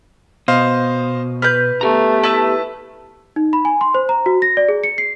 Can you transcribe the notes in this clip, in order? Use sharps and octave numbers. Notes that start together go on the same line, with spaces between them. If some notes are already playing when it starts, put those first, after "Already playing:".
B2 C5 D#5 F5
B4 F6 G6
A3 B3 G4 A#5
E4 B4 A5 E6
D#4
B5
G#5
C6
C5
A#5
F#4
A#6
D5
G#4
C#7
C7